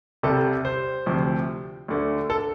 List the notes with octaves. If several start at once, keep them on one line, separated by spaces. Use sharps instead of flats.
C2 C3 G3 A4
C5
D2 C3 F3
D2 D3 A3
A4